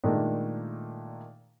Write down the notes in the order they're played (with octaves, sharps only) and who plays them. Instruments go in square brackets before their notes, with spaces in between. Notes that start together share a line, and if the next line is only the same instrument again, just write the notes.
[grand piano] A#2 D#3 G#3 A3 D4 D#4